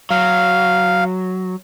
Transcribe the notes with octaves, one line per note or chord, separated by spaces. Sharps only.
F#3 F5